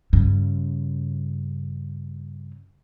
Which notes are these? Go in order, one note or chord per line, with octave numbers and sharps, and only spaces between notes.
G2 C#3